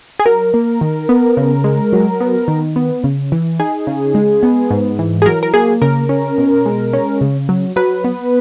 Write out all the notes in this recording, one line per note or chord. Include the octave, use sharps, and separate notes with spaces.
G#4
F#3 A#4
A#3
D#3
B3
C#3
G#3
F#3
B3
D#3
B3
C#3
E3
D#4 G#4
C#3
G#3
B3
G#2
E3
G#4
F#3 A#4
A#4
A#3 G#4
C#3 A#4
C#4
B2
G#3
C#4
C#3
F#3
F#3 B4
B3